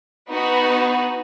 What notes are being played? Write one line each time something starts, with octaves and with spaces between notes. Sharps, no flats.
B3 D#4 F#4